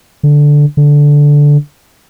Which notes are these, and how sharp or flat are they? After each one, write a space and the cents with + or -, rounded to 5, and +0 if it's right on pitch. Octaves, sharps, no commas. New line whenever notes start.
D3 -5
D3 -10